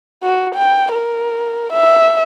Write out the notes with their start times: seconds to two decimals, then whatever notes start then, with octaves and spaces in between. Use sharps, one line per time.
0.23 F#4
0.55 G5
0.92 A#4
1.72 E5